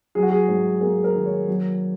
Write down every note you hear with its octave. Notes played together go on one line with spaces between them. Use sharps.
F#3 G#4
F#4
G#4
G#2
A#3 G#4
A#4
D#3
C#5
F#3